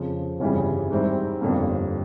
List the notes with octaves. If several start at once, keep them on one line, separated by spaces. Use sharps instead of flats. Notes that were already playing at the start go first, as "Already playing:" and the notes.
Already playing: F2 C#3 F3
G1 F2 C#3 E3 G3
G#2 D#3 G3 C4 E4
G1 F2 D3 G3 A#3